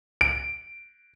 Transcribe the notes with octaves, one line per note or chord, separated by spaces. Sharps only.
D7